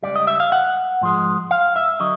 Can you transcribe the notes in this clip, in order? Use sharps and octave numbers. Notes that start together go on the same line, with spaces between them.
C#2 B2 G3 D5
D#5
E5
F5
F#5
G#2 F3 G#3
F5
E5
D3 F#3 D#5